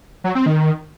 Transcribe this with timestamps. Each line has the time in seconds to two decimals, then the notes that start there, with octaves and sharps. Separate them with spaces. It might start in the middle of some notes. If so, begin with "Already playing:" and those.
0.24 F#3
0.35 C4
0.46 D#3